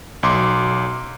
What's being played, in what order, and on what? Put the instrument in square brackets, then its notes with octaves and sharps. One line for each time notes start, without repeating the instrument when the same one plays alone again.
[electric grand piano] B1 C6 D6